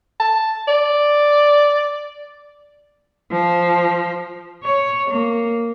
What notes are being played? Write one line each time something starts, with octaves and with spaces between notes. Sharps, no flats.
A5
D5
F3
C#5
A#3